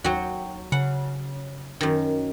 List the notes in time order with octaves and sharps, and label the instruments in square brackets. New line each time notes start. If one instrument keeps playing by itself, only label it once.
[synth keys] D#2 G5 [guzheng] F#3 F#4
[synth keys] C#3 [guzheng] F#5
[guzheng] F#2 D#3